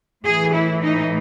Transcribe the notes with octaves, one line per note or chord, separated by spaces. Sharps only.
A2 E3 G#4
E4
D#4